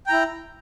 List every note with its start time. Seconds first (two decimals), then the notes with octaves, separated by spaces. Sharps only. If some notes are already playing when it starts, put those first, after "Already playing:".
0.06 G5
0.09 A#5
0.11 E4